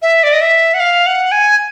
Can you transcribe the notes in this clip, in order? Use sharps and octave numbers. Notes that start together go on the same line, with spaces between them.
E5
D5
D#5
E5
F#5
F5
F#5
G#5